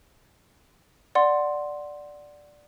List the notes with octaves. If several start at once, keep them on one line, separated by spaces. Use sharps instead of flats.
D5 F#5 C6